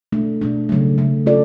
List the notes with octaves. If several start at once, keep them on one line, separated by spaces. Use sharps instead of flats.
B2 A3 D4
B2 A3 D4
C#3 F#3 A3
C#3 F#3 A3
A3 C#4 F4 A4 D5